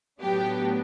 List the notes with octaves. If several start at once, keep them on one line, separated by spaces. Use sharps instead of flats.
A2 F#3 B3 D4 G4